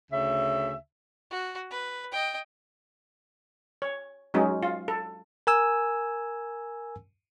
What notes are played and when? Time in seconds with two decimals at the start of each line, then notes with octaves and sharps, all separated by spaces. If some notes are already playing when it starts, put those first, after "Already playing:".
0.11 D2 C#3 E5
1.31 F#4
1.71 B4
2.12 D#5 G5
3.82 C#5
4.34 F#3 G#3 C#4 D#4
4.63 F4
4.88 A4
5.47 A#4 G#5 E6